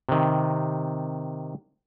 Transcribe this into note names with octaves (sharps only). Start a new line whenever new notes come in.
C3 D#3